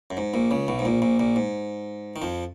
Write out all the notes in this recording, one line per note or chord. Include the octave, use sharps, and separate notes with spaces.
F#2
G#2
A#1 A#2
C#2 C#3
B1 B2
G#2
A#1 A#2
A#1 A#2
A#1 A#2
G#2
D#3
F2 F3